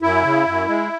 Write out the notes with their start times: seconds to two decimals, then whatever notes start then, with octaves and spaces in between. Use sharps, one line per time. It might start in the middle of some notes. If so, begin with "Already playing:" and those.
0.02 F#2 E4
0.24 C#3
0.46 F#2
0.68 G#3